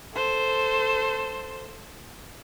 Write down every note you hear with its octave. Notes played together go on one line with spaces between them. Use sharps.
A4 C5